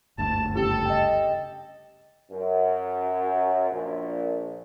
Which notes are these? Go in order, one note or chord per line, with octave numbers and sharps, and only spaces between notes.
F#1 D2 G2 A5
C#3 G4 A4
D#5 G5
F#2
A#1